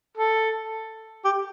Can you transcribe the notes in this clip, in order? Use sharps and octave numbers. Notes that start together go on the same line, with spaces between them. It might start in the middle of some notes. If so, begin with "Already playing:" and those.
A4
G4